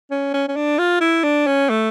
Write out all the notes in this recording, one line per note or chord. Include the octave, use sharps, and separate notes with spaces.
C#4
C#4
C#4
D4
F4
E4
D4
C#4
A3